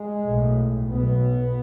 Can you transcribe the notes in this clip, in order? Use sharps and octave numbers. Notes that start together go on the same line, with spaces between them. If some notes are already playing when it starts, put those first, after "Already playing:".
Already playing: G#3
B1 A2
B1 B2 B3